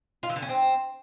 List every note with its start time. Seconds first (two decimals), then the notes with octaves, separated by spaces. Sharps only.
0.23 F4
0.29 E3
0.36 D3
0.42 C#4
0.49 C4